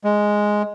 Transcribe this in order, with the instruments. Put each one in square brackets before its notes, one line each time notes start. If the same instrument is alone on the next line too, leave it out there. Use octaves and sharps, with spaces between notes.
[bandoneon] G#3